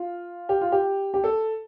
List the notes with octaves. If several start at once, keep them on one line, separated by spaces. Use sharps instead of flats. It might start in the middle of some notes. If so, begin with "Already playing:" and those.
Already playing: F4
G4
F4
G4
G4
A4